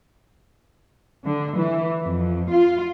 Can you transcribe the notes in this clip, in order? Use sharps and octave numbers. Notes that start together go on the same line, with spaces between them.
D3
E3
F2
F4